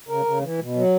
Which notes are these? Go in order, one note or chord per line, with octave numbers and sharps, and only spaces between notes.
C#3 A#4
C#3
E3
B2
F#3